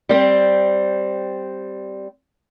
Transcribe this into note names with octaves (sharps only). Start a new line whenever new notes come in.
G3 C4